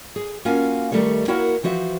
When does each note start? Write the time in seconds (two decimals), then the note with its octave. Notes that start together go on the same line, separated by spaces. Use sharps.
0.16 G#4
0.45 A#3 C#4 F4 F#4 F5 G#5
0.92 D#3 G3 A3 A4 C#5
1.28 A#3 E4 F#4 A#4 C#5 F#5
1.63 E3 F3 F#4 C5 E5